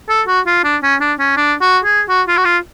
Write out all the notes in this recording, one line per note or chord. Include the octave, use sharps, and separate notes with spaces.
A4
F#4
F4
D4
C#4
D4
C#4
D4
F#4
G#4
F#4
F4
F#4
F4